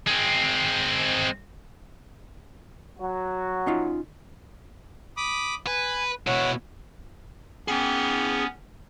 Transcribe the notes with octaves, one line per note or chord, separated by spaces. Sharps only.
G#3 C4
F#3 F#4
C#4 D#4 F4
B5 D6 D#6
B4 G#5
B2 E4 C#5 F#5
B3 C#4 G#4 G5